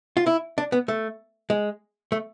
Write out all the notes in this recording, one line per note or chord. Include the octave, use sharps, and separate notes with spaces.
F4
E4
D4
B3
A3
G#3
A3